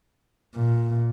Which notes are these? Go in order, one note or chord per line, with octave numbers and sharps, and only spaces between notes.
A#2